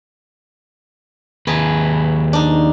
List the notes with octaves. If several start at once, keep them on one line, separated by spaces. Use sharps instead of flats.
D#2 G#4 B4 A5 A#5
D4 D#4